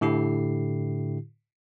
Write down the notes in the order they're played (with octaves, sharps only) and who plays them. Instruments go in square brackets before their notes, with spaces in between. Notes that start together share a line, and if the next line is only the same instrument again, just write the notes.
[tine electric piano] A2 D3 E4 G4 C7